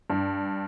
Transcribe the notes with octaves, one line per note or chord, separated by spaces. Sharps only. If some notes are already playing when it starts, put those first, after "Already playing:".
G2